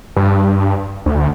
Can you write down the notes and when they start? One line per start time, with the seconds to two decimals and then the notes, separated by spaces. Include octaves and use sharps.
0.16 G2
1.06 D2